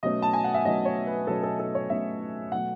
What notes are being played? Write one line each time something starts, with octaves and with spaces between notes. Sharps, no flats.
B2 F#3 A3 C#4 D#5
A5
G#5
F#5
E5
B2 F#3 A3 C#4 D#5
C#5
B4
B2 F#3 A3 C#4 A4
A4
A4
C#5
B2 F#3 A3 C#4 E5
B2 F#3 A3 F#5